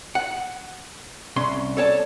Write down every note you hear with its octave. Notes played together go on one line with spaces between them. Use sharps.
F#5
C2 C#4 C6
A4 C#5 D5 A5